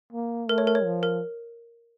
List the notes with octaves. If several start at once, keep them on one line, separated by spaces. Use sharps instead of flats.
A#3
A3 A#4
C#5
A#4
C#5
F3
A#4